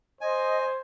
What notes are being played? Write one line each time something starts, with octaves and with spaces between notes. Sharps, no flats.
C5 D#5 G#5